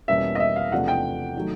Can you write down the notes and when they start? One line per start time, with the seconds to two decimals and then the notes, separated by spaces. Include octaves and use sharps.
0.08 E2 B2 G3 A#3 C#4 E5
0.35 D#5
0.40 E5
0.56 F5
0.71 E2 C3 F3 A3 D4 F#5
0.88 G5
1.37 D#3 F#3 A3